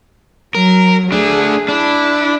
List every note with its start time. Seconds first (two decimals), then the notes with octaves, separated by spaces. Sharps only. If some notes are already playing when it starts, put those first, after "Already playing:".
0.55 F#3 A#4
1.12 A3 D4 G#4
1.69 D4 E4